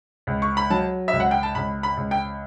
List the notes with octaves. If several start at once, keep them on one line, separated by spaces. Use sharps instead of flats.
C#2
C#6
B5
F#3 A5
E5
C#2
F#5
G5
A5
C#2 B5
B5
C#2
G5